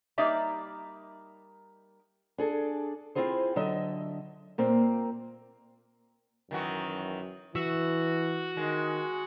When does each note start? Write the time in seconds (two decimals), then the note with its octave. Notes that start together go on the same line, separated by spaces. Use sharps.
0.18 G3 A#3 D#4 D5 E5 A#5
2.38 D4 G#4 A4
3.15 C4 C#4 E4 F4 G#4 C5
3.56 D3 F#3 D#5 E5
4.58 A#2 A#3 C4
6.51 F#2 D#3 E3 F#4
7.55 E3 F#4 E5
8.57 D#3 G#3